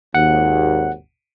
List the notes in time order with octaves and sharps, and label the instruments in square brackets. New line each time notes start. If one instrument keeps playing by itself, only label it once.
[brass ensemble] G#1 D#2 [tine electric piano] F#5